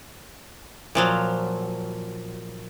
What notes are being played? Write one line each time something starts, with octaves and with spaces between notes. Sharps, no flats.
A#2 F3 F#3